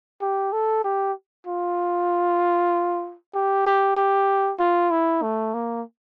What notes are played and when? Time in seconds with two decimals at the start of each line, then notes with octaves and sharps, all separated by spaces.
0.21 G4
0.53 A4
0.84 G4
1.47 F4
3.34 G4
3.66 G4
3.96 G4
4.59 F4
4.91 E4
5.22 A3
5.54 A#3